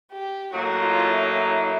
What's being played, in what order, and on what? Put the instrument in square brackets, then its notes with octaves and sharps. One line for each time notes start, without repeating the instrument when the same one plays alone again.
[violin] G4
[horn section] A2 F#3 A#3 D#4 [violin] F#4
[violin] F4
E4